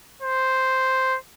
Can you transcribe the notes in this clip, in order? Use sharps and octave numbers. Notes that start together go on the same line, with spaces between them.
C5